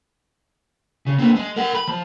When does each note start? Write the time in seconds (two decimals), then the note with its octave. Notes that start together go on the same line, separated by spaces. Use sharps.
1.07 C#3
1.19 A#3 C4
1.35 G#3
1.56 A#4 F#5
1.75 B5
1.88 F3